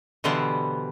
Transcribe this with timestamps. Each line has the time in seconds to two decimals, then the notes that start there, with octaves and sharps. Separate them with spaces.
0.24 B2 D3 E3 G3 B3 C5